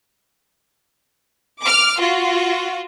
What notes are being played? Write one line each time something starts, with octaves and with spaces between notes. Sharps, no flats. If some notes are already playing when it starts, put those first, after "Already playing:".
D6 F6
F4 F#4